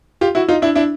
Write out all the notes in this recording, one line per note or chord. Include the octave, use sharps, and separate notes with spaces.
F4 G4
E4 F#4
D#4 F4
D4 E4
D4 E4